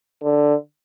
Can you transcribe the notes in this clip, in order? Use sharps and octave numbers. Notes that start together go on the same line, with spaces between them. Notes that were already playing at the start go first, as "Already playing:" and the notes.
D3